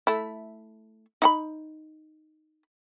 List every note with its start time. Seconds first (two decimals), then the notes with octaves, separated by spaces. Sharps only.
0.07 A3 E4
1.22 D#4 F#5 B5